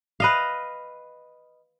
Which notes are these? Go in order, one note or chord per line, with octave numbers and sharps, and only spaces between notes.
B4 D#5 F5